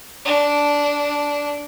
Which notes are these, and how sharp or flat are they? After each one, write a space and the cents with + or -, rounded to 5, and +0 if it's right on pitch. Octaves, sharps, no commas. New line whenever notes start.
D4 -10